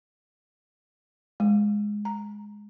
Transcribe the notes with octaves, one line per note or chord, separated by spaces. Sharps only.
G#3
A#5